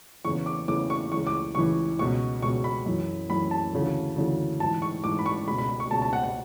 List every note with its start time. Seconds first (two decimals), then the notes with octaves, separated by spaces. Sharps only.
0.25 E2 C#3 E3 C#6
0.46 D6
0.68 E2 C#3 E3 D6
0.90 C#6
1.12 C#2 C#3 E3 C#6
1.27 D6
1.55 C#2 C#3 E3 C#6
1.99 C#2 B2 C#6
2.42 C#2 B2 C#6
2.64 B5
2.86 F#2 E3
3.30 F#2 E3 B5
3.51 A5
3.73 D2 C#3 E3
4.16 D2 C#3 E3
4.60 G#2 E3 A5
4.82 C#6
5.04 G#2 E3 D6
5.19 B5
5.26 C#6
5.47 C#2 B2 B5
5.58 B5
5.69 B5
5.80 C#6
5.91 C#2 B2 A5
6.02 A5
6.13 F#5
6.23 F#5